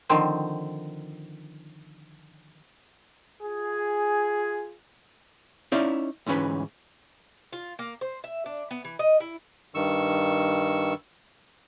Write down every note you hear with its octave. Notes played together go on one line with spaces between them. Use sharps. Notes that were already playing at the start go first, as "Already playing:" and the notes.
D3 D#3 F3 C4
F4 G#4
C#4 D#4 E4 D5 E5 F5
D2 G#2 E3 C#4 B4
F4
A#3
C5
E5
D4
B3
E3
D#5
E4
G2 D#3 C#6 E6